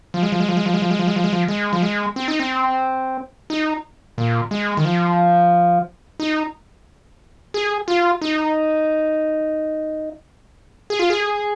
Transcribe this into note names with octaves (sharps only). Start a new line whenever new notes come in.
F3
G#3
F3
G#3
F3
G#3
F3
G#3
F3
G#3
F3
G#3
F3
G#3
F3
G#3
F3
G#3
C4
D#4
C4
D#4
A#2
G#3
D#3
F3
D#4
G#4
F4
D#4
G#4
F4
G#4